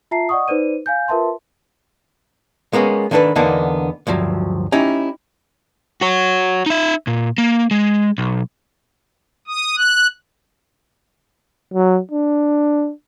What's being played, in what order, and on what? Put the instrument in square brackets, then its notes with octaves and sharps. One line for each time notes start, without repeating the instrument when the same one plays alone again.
[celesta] F4 E5 A5 A#5 C7
D5 D#5 F#5 C#6 D#6
D#4 B4 C5 D5 D#7
F5 G#5 G6
F4 A#4 B4 E5 A5 C6
[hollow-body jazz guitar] G#3 A#3 B3 C#4
D#3 A#3 D4 A4 B4
E2 D3 A#3 B3 D4 D#4
D2 G2 F3 F#3
C#4 D#4 E4 G4
[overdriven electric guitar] F#4 C#5
D#4 E5
A#2
A#3
G#3
B1
[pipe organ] D#6
F#6
[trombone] F#3
D4